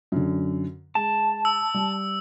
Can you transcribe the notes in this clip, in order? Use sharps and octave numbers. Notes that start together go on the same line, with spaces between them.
F#2 D3
G#3 A5
E6
G3